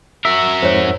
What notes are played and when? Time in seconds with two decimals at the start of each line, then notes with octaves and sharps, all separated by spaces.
0.25 F#4 A#4 E5
0.62 F2 G#2 C5 C#5 F#5